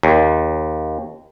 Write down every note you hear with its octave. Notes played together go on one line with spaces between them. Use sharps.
D#2